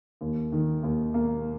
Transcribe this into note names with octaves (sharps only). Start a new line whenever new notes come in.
D#2
D#3
D#2
A#3